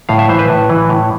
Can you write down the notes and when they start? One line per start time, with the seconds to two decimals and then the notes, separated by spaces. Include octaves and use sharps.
0.09 A2 F5
0.19 E5
0.29 E3 C5
0.39 B4
0.48 A2
0.69 E3
0.89 A2